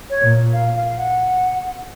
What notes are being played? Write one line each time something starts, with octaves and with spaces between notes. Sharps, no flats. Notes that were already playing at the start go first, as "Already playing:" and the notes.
C#5
A#2
F5
F5
F#5